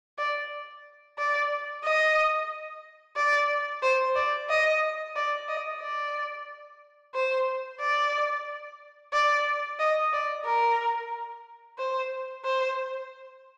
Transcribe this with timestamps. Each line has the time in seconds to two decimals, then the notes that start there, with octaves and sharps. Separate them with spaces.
0.18 D5
1.18 D5
1.83 D#5
3.16 D5
3.82 C5
4.15 D5
4.49 D#5
5.16 D5
5.48 D#5
5.81 D5
7.14 C5
7.80 D5
9.13 D5
9.79 D#5
10.13 D5
10.45 A#4
11.78 C5
12.44 C5